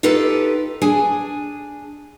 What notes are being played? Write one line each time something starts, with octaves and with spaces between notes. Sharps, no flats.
D#4 F4 G4 A4 B4
D4 G#4 G#5